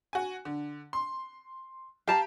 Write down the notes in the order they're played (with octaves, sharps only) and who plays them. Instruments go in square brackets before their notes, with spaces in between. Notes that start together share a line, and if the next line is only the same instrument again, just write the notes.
[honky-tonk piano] F#4 G#5
D3
C6
[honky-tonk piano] G4 [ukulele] F5 A5 A#5